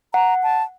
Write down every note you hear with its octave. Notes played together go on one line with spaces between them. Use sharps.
F#5 A#5
A5